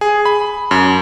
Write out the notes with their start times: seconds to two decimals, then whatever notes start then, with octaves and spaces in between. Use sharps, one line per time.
0.01 G#4
0.25 B5
0.71 F#2